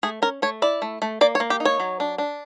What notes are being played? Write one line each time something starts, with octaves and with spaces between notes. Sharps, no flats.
A3 G#4
C#4 A#4
A3 C#5
E4 D5
A3
A3
A#3 D5
C#5
A#3
G4
D#4
C#5
F#3
D4
D4